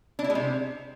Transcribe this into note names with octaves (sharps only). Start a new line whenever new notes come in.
D4
E4
G#3
C3